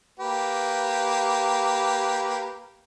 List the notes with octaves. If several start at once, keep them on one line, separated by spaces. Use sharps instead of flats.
A#3 G4 B4